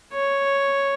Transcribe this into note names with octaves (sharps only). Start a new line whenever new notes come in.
C#5